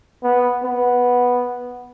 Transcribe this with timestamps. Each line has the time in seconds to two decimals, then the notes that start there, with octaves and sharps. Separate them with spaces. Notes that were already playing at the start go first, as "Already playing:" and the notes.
0.23 B3
0.63 B3